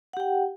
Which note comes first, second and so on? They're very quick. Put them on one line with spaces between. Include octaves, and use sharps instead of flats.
F#5 G4 G5